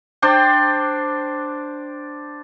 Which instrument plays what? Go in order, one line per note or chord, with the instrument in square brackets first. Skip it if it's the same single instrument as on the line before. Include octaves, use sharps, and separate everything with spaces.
[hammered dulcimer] D4 C5 D5 G5